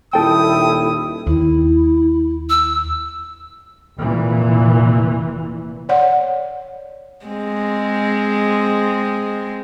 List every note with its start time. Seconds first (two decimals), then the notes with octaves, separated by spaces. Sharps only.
0.13 D#1 E4 A4 G5 D#6
1.27 D#2 E4
2.49 E6
3.99 F1 A#2 E3
5.89 C#5 D5 F#5
7.25 G#3 C4